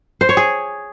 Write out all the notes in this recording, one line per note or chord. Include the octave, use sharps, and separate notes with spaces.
C5
C#5
G#4